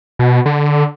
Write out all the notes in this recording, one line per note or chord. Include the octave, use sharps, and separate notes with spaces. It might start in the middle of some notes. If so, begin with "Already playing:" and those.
B2
D3